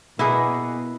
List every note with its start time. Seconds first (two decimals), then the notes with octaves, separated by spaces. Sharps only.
0.19 B2 A#3 B3 E4 G#4